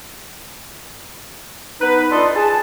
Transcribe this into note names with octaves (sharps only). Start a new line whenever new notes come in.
B3 D#4 B4
D4 F4 A4 D#5 C6
G#4 A5